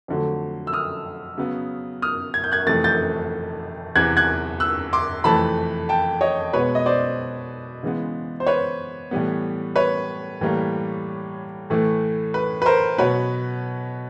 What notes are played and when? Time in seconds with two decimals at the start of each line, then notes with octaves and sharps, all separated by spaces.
0.08 F2 D3 F#3 A3
0.67 E6
0.73 D#6 F6
1.37 C#3 F#3 B3
2.02 D#6 F6
2.34 G#6
2.44 G6
2.52 F#6 G#6
2.67 F2 C3 E3 A3 A6
2.84 G6 A6
3.96 E2 C3 E3 F#6 G#6
4.17 F#6 G#6
4.60 E6 F#6
4.93 C6 D6
5.24 F2 C3 E3 A3 A5 B5
5.89 G5 A5
6.21 C#5 D#5
6.53 B2 G#3 B3 B4 C#5
6.75 D#5
6.86 C5 D5
7.83 C#3 E3 G#3 B3
8.40 C5
8.46 B4 C#5
9.11 A2 E3 G3 B3
9.76 B4 C#5
10.41 A2 E3 G3 A#3
11.70 A2 E3 A3
12.34 B4
12.62 B4
12.66 A#4 C5
12.98 B2 F#3 B3 B4 C#5